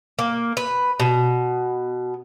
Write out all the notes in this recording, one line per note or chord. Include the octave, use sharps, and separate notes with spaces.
A#3
B4
B2